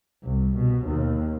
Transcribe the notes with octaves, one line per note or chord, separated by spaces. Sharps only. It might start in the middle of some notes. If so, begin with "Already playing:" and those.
C2
B2
D#2